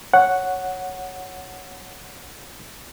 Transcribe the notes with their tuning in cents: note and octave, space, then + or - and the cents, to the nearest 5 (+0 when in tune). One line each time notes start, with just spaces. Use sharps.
C#5 +0 F#5 +0